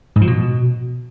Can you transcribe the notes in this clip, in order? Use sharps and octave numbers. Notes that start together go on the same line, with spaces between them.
G#2
F3
B2